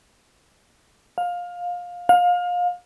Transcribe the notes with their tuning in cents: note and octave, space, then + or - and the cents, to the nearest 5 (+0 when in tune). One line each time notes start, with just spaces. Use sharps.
F5 +20
F5 +30